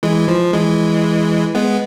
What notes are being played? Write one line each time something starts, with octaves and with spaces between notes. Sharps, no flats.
E3 G#3
F3
E3 G#3
G#3 B3